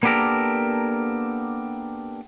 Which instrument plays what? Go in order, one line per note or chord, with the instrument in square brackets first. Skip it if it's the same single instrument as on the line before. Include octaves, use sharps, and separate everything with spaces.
[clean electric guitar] A#3 B3 D4 G4 A4 A#4